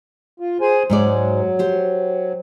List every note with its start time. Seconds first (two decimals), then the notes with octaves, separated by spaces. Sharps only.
0.40 F4
0.61 G#4 C5 G#5
0.90 G#2 F#3 G#3 D5
1.59 G4 C5